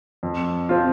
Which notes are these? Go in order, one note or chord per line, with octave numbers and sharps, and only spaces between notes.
F2
F3 C4 F4